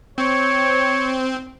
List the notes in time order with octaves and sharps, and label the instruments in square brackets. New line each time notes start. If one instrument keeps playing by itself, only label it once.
[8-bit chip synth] C4 [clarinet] C#5